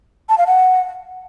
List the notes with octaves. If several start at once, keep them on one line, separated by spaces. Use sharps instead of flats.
A5
F5
F#5